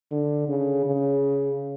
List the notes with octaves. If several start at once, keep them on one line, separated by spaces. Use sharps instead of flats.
D3
C#3
C#3